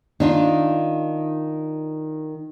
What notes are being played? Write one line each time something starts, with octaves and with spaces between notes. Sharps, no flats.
D#3 D4 F4